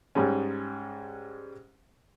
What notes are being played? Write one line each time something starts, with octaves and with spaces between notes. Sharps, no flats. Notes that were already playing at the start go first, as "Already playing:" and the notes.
G#2 G3 G#3 C#4